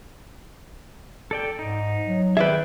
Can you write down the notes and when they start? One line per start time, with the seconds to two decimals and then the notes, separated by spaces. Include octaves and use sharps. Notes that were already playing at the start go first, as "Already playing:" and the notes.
1.31 A4 D5 G5
1.59 G#2 D#4
2.06 F#3
2.37 D#3 G#4 B4 D5 E5 G5